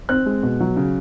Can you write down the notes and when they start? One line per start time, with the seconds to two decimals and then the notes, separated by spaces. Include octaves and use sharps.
0.09 C4 F#6
0.26 G#3
0.43 B2
0.60 F#3
0.76 C#3